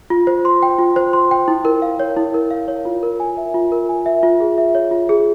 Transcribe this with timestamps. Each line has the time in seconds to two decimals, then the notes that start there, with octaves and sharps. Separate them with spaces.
0.10 F4
0.27 C5
0.45 C6
0.63 G5
0.79 F4
0.96 C5
1.13 C6
1.31 G5
1.48 E4
1.65 A#4
1.82 F5
2.00 C#5
2.17 E4
2.34 A#4
2.51 F5
2.68 C#5
2.85 F4
3.03 A#4
3.20 G#5
3.37 E5
3.54 F4
3.72 A#4
3.89 G#5
4.06 E5
4.23 F4
4.40 G#4
4.58 E5
4.75 C#5
4.91 F4
5.09 G#4